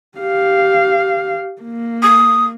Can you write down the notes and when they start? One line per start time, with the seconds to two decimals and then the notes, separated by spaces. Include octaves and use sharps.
0.18 G4 F5
1.62 A#3
2.03 D#6